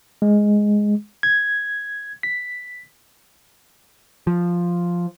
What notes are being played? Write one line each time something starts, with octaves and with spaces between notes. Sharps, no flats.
G#3
G#6
B6
F3